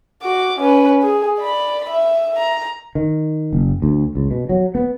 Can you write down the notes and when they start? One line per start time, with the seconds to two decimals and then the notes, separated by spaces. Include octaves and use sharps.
0.22 F#4 D6
0.60 C#4 B4
1.03 G#4
1.40 D5 B5
1.89 E5
2.38 A#5
2.95 D#3
3.53 F#1
3.82 D2
4.15 C#2
4.31 B2
4.49 F#3
4.75 B3